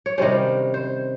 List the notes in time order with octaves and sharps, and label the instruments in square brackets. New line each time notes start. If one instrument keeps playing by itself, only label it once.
[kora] C#5
C3 D#3 G3 C#4 C5
C5